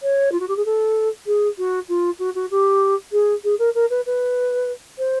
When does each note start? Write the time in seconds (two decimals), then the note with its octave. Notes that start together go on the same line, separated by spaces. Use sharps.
0.02 C#5
0.32 F4
0.40 F#4
0.48 G4
0.56 G#4
0.65 A4
1.26 G#4
1.58 F#4
1.88 F4
2.19 F#4
2.35 F#4
2.51 G4
3.12 G#4
3.44 G#4
3.59 A#4
3.75 A#4
3.90 B4
4.06 B4
4.98 C5